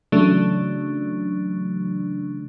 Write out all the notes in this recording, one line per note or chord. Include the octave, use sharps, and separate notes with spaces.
C#3 E3 F#3 A3 D4